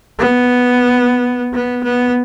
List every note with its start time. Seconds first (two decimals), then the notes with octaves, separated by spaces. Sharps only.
0.19 B3
1.53 B3
1.84 B3